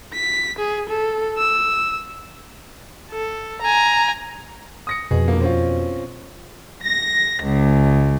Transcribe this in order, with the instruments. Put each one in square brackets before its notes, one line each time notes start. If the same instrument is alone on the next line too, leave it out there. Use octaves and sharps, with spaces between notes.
[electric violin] B6
G#4
A4
E6
[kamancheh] A4
G#5 A#5
[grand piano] D#6 A#6 C#7
[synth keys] F2 B2 [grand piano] G#4
[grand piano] E1 A#3
C4 C#4 F4
[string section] A#6
C#2